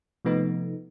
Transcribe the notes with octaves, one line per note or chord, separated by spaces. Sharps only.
C3 F3 A3 B3 D#4